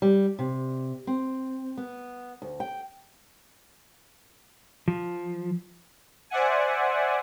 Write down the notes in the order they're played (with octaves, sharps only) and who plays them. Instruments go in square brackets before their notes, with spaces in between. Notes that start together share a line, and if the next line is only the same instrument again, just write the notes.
[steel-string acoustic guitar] G3
C3
C4
B3
D2
G5
[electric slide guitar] F3
[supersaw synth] C5 D5 E5 F#5 G#5